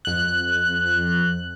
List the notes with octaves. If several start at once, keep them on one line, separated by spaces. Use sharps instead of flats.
F2 F#6